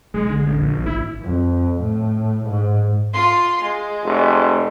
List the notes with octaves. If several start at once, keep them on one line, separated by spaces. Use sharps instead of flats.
B1 G#3
D3
A1
A#1
G#1 E4
F2
A2
G#2
F4 C6
G#3
F1